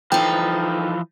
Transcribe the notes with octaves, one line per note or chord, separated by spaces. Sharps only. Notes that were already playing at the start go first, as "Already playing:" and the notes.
E3 F3 D#4 A4 G5